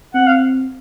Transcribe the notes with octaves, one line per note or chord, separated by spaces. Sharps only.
C4 F#5
F5